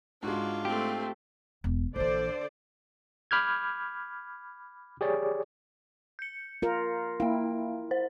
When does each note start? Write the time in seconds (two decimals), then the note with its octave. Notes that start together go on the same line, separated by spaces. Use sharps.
0.23 G#2 G#3 D4 F4 F#4
0.65 A3 C4 G4
1.64 E1
1.96 A#1 D3 E3 C5 D5
3.31 B5 D6 F6 G6 G#6
5.01 G4 G#4 C#5 D5
6.19 G6 C#7
6.62 F4 A#4
7.20 A#3 E4 F5
7.91 C5